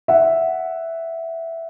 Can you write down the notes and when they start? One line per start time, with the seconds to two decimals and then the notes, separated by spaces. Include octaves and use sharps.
0.08 E5 F#5